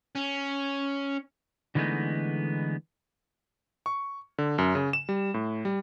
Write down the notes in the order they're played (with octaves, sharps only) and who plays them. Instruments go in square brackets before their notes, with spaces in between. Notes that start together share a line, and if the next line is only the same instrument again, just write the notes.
[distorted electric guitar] C#4
[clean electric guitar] D3 E3 G#3 A3 B3 D#4
[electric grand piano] C#6
D3
F#2
C#3
E7
G3
A2
G3